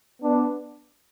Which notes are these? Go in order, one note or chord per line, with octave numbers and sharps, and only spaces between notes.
B3 D4